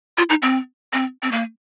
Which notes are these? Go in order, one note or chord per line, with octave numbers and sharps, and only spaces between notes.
F4
D#4
C4
C4
C4
A#3